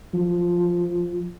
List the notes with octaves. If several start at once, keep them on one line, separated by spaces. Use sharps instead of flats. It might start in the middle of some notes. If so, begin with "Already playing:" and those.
F3